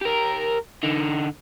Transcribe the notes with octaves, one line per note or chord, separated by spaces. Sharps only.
G4 A#4
D3 D#4